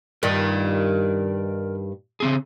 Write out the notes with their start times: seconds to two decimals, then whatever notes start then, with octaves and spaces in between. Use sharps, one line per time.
0.23 G2 D#3 A#4 D5
2.20 C#3 C4 G#4